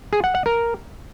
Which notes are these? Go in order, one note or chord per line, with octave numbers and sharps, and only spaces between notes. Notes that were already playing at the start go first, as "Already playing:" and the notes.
G#4
F#5
F#5
A#4